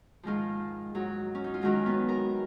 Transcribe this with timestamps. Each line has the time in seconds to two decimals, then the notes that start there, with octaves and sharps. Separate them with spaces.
0.23 G#2 D#3 F3 G#3 F4
0.95 G#2 F#3
1.35 C#4
1.44 D#4
1.54 F4
1.61 F#2 D#3 F#3 G#3 F#4
1.86 B3 B4
2.08 A#4 A#5